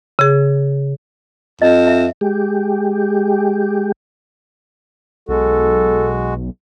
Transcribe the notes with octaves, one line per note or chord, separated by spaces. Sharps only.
C#3 G#4
F2 D#5
E5
G#3 G4
B1 G#3 F#4 A4